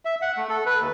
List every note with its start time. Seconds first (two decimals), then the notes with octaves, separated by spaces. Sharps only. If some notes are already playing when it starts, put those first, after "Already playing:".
0.05 E5
0.22 F#5
0.36 A3
0.49 A4
0.66 B4
0.80 D#2